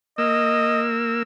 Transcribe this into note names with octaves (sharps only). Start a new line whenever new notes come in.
A#3 D#5 E6